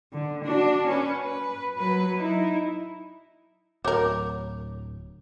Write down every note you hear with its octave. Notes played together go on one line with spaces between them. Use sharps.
D3
D4 F#4
C#4 B4
B4
F#3 B4
D#4 E4
D1 F#4 A#4 C#5 D6